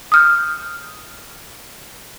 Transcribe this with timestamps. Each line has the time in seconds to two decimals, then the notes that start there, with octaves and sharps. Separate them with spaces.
0.12 D#6 F6 G6